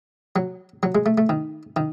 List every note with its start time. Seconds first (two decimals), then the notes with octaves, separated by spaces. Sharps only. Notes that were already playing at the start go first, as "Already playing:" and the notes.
0.36 F#3
0.83 F#3
0.95 G#3
1.06 A3
1.18 A3
1.29 D#3
1.76 D#3